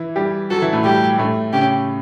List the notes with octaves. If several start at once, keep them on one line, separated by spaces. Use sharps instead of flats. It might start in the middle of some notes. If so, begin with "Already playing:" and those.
Already playing: E3 E4
G3 G4
F#3 F#4 A4
E3 E4
A2 A3
G3 G4
A2 A3
C#3 C#4 G4